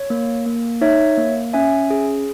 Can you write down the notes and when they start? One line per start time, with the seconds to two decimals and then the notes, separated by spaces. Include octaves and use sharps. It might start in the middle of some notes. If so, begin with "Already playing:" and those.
Already playing: C#5
0.10 A#3
0.46 A#3
0.81 D#4 C#5 E5
1.17 A#3
1.54 C#4 E5 G#5
1.90 G#4